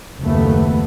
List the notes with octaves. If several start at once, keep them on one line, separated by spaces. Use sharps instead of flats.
F#1 D#2 F3 A3 B3